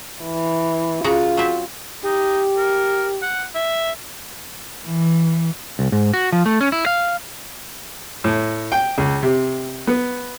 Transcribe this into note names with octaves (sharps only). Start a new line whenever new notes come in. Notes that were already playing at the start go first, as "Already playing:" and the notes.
E3
C#3 F4 F#4 A#5
F#3 C4 E5
D#4 G4
A#4
F#5
E5
E3
C2
G#2
F#4
F3
A3
C#4
E4
F5
A2
G5
C#2
C3
B3